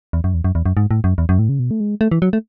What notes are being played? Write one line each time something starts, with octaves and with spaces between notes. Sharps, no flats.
E2
F#2
E2
F#2
E2
F#2
G#2
A2
F#2
E2
F#2
A2
C#3
B2
A3
G#3
A3
E3
F#3
A3